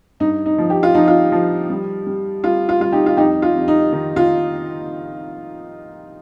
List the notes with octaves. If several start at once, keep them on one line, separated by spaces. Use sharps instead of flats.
G2 D#4
D#4
F3
G4
F4
F3 D#4
F4
F3
G3
G3
G3 F4
F4
G3 F4
D#4 G4
F4
F2 D#4 G4
F4
F2
D#4
D#3
F4